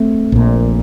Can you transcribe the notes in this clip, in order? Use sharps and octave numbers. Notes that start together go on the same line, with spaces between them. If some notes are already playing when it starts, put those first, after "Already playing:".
Already playing: A3 C4
A#1 A#2